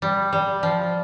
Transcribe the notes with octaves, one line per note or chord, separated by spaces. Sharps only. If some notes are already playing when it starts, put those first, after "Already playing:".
G3
G3
F3